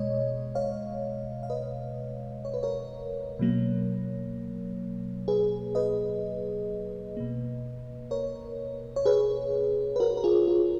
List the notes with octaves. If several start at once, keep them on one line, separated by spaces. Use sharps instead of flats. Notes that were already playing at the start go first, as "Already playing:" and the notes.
Already playing: B2 G#3 C#5 D#5
C#5 F5
F5
B4 D#5
C#5
B4
A#4 C#5
B2 F#3 A#3
G#4 B4
B4 D#5
B2 A#3
A#4 C#5
C#5
G#4 B4
B4
F#4 A#4
A#4
F4 G#4
F4 G#4